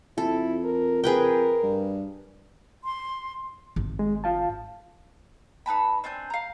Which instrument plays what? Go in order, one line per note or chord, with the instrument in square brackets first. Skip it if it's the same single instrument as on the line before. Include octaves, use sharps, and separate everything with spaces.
[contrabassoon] F2 [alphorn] E4 [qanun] A4
[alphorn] A#4
[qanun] G#4 B4 G5 [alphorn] A#4
[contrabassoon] G2
[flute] C6
[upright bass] G#1
[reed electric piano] G#3
F4 F5 A5
[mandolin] D#4 B4 A5 B5
C4 D4 G#5 G6
F5 A#5